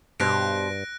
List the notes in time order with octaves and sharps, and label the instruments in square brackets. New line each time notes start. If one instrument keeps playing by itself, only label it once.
[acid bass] G2 [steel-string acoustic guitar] B2 G4 C5 [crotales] F#6 A#6 D7